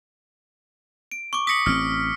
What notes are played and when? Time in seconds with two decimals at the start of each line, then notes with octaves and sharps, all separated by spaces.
1.12 D7
1.33 C#6 D6
1.47 D#6 A#6 B6 C#7 F#7
1.66 A1 C4 F6